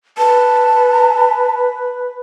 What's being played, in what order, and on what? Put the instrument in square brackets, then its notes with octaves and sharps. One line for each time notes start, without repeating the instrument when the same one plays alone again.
[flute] B4 [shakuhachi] A5